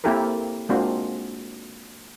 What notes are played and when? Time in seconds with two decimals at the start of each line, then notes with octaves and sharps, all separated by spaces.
0.04 A#3 C4 E4 G4 A4 A#4
0.69 G#3 A#3 C4 D4 F4 F#4